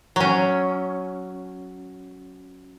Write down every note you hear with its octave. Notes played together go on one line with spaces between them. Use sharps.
F#3 C#4